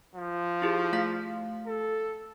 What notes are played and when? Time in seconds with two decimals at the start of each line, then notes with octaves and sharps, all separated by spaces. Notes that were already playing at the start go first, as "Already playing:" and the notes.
0.15 F3
0.62 E4 G4 G#4
0.93 A3 F5 B6
1.67 A4